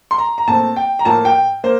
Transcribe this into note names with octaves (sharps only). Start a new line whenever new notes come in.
C6
A#5
A#5
A#2 A3 C4 A5
G5
A#5
A2 F3 A#3 A5
G5
A#3 C5